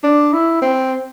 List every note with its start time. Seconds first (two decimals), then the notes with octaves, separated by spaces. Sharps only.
0.03 D4
0.33 E4
0.62 C4